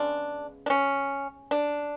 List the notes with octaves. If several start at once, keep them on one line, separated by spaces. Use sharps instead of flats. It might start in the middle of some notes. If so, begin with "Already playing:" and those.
Already playing: C#3 G#3 B3 D4
D4
C#4
D4